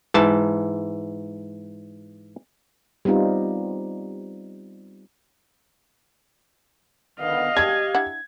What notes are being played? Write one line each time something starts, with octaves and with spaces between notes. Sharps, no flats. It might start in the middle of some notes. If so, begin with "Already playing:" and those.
G#2 E3 A5
G3 B3 C4 D#4 F4
D3 D#3 B3 D#5 F5
F#3 G#3 D4 G4 G#6
D4 E4 F#5